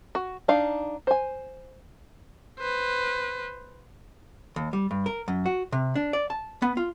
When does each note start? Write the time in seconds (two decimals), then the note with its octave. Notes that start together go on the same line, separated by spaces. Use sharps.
0.15 F#4
0.48 D4 D#4 F5
1.07 C5 G#5
2.59 B4 C5
4.56 D#2
4.73 G3
4.91 G2
5.06 A#4
5.28 F#2
5.46 F#4
5.72 C3
5.95 D4
6.13 D5
6.30 A5
6.62 B3
6.77 F4